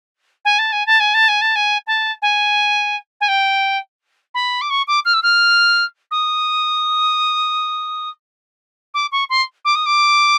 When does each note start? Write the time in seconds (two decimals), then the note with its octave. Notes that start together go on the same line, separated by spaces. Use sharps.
0.45 G#5
0.59 A5
0.72 G#5
0.86 A5
1.00 G#5
1.14 A5
1.28 G#5
1.41 A5
1.56 G#5
1.87 A5
2.22 G#5
3.21 G#5
3.28 G5
4.34 B5
4.61 D6
4.70 C#6
4.87 D6
5.05 F6
5.14 E6
5.23 F6
6.11 D#6
8.94 D6
9.12 C#6
9.29 C6
9.65 D6
9.75 D#6
9.86 D6